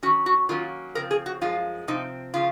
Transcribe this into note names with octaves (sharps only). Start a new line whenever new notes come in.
D#3 F#3 C#4 F#4
F#4
D#3 F#3 A#3 C#4 F4
C#3 F3 C4 A#4
G#4
F#4
F#2 F3 G#3 F4
C3 F3 C4 D#4
C#3 F3 F4